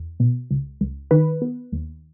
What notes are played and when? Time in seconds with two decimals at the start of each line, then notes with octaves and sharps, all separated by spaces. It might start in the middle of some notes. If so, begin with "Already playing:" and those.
Already playing: E2
0.20 B2
0.51 C#2
0.81 C#2
1.11 D#3 B4
1.42 B3
1.72 D#2